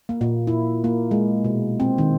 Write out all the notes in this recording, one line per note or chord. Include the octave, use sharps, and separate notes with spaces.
A#3
A#2
E4
A#3
G#3
B2
C4
D#3